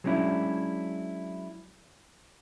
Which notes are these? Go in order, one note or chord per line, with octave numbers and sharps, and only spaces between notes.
F#3 G#3 C#4 D4 E4